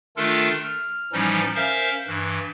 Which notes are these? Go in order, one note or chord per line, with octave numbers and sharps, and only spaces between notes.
D#3 A3 D4 F4 A4 A#4
F6
A2 E3 F3 G3 C#4 D#4
C#4 A#4 C5 E5 F5
G2 E3 F#6